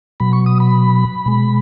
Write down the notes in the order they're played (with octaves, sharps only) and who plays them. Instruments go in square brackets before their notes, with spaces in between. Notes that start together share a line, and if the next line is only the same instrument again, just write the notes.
[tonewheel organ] B2 F#3 B5
C#6
D#6
B5
B2 G#3